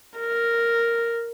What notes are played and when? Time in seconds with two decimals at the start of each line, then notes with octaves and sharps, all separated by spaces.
0.18 A#4